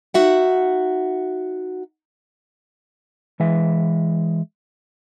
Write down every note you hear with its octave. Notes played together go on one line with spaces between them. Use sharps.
D#4 F#4 E5 F#5
E3 G#3 E5